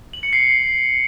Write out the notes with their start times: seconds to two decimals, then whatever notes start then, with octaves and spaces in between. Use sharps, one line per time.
0.13 F#7
0.23 C#7
0.33 C7